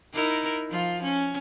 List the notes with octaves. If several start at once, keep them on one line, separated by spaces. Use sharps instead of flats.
D#4 E4 A#4
F3 F4
C#4